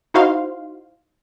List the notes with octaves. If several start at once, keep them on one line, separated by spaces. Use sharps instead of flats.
D#4 E4 F#4 C5 F5 C6